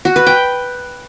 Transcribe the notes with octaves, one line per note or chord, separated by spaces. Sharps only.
F#4
B4
G5